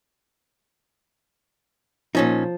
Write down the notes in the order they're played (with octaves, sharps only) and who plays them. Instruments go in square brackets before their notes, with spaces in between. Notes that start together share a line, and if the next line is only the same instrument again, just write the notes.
[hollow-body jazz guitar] A#2 C#4 D#4 [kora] F3